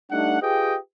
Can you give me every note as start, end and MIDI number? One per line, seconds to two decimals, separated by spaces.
0.11 0.38 55
0.11 0.38 57
0.11 0.38 62
0.11 0.38 63
0.11 0.38 78
0.42 0.77 65
0.42 0.77 67
0.42 0.77 68
0.42 0.77 71
0.42 0.77 75
0.42 0.77 79